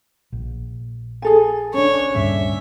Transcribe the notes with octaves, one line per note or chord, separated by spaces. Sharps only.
A#1
G#4 A4 G#5
C#4 D4 C#5
D2 G2 A#2 E5